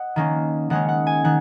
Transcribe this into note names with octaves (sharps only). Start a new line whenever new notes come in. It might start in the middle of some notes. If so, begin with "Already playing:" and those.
Already playing: D#5 F#5
D#3 A#3 C#4
D#3 G#3 C#4 F#5
F#5
G#5
D#3 F#5